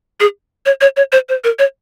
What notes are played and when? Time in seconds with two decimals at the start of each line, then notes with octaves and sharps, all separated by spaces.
0.20 G#4
0.66 C#5
0.81 C#5
0.97 C#5
1.12 C5
1.29 C5
1.44 A#4
1.59 C#5